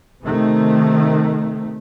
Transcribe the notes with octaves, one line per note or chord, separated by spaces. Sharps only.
C3 D#3 A3